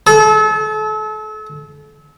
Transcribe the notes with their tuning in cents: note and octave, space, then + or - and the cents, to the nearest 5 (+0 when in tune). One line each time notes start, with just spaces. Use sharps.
A4 -35